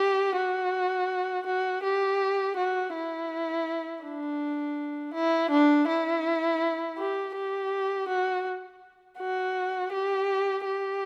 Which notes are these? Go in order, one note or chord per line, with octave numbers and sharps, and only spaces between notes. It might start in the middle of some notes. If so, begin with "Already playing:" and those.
Already playing: G4
F#4
F#4
G4
F#4
E4
D4
E4
D4
E4
G4
G4
F#4
F#4
G4
G4